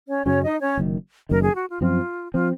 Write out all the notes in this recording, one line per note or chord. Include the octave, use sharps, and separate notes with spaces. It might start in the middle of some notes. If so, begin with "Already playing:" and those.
C#4 C#5
F#2 C#3 F#3 C#4 C#5
D#4 D#5
C#4 C#5
F#1 F#2 D#3
F#1 F#2 D#3 A#4
G#4
F#4
F4
F#2 F3 C4 F4
F3 C4 F4